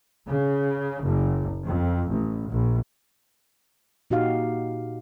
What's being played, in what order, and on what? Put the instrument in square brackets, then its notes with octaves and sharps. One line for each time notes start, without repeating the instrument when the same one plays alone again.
[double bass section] C#3
F#1
F2
A1
A#1
[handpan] A#2 D#4 F#4 G4 F5